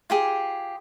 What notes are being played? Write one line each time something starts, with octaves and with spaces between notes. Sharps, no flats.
F4 G4 G#4